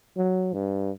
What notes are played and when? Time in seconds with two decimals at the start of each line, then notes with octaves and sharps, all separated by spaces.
0.17 F#3
0.53 G2